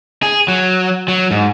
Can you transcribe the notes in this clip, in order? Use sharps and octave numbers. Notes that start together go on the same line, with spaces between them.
G#4
F#3
F#3
G#2